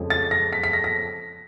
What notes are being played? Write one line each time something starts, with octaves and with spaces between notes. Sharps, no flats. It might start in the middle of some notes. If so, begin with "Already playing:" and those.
Already playing: F2 C#3 F3 G#3
A6
A#6
B6
B6
A#6
A#6